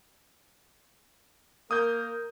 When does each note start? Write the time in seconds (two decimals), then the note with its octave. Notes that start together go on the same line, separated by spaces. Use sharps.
1.71 A#3 A#4 D#6 G6